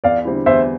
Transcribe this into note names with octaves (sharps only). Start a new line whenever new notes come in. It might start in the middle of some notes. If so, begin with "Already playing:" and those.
E2 D5 F5
D3 G3 C4 E4
E2 C5 E5